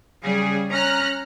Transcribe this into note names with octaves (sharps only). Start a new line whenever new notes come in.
C#3 G3 G#4
C#4 A#5 F6 F#6